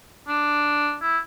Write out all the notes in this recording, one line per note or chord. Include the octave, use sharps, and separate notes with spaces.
D4
E4